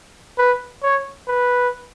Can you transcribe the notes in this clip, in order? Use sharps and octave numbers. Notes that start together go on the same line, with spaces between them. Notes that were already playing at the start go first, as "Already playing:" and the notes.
B4
C#5
B4